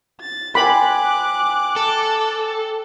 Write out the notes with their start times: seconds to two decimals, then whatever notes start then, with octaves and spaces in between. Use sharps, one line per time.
0.21 A6
0.55 C5 G5 G#5 B5 D6 F#6
1.76 A4